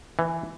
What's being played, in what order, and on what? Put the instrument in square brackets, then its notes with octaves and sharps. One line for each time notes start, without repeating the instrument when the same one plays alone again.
[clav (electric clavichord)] E3